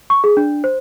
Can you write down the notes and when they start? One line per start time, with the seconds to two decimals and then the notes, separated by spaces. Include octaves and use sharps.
0.10 C#6
0.24 G#4
0.37 D4
0.64 C5